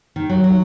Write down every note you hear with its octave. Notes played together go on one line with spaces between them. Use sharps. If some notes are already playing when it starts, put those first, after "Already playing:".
D#3
F#3
F#3